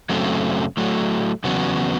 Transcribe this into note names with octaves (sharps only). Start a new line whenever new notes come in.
F#2 C#3 F#3 A3 C4
A2 F#3 A3
E2 C#3 F#3 B3